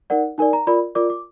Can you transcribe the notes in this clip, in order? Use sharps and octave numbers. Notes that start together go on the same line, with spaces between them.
D#4 A#4 D5 F#5
D#4 A#4 D5 G#5
A#5
F4 A#4 D5 B5
F4 A#4 D5 D6
D6